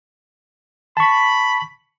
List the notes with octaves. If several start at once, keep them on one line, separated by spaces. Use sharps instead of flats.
A5 B5 C#6